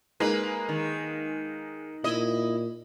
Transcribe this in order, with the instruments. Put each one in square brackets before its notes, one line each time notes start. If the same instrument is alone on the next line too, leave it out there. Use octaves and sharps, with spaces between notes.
[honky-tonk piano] G#3 A#3 D#4 [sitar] B4
[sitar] D#3
[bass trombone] A#2 [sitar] E4 D#5